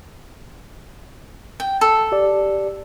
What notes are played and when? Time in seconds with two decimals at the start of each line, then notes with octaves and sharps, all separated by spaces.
1.60 G5
1.81 A4
2.12 G4 D5